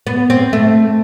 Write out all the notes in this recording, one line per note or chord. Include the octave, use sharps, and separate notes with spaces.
B3
C4
A3